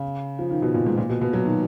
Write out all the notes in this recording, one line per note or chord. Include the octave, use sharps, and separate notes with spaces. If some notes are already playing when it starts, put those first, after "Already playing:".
Already playing: C#3
F3
D#3
B2
A#2
G#2
A#2
B2
B2
F#3
D#3